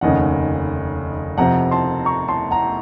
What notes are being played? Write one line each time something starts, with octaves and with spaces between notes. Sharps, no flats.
F1 D#2 C#3 D#5 F#5
F2 C3 F3 C4 F#5 A#5
A5 C6
A#5 C#6
A5 C6
F#5 A#5